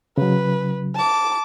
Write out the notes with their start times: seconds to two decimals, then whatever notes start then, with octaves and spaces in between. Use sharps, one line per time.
0.18 C#3 F#3 B4
0.95 A5 D6